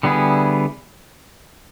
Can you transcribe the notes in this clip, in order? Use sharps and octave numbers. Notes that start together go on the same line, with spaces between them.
D3 G3 B3 E4 G#4